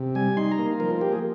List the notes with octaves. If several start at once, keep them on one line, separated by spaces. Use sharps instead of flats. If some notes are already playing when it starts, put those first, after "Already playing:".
Already playing: C3
G3 G#5
D#4 C6
A#5
A#3
F3 A#4
F4
A#3 G4
G#4